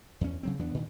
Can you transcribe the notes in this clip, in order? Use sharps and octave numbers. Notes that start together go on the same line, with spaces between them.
E2 C#4
C#3 F#3 C4
E2 E3 B3 D4
A#2 D#3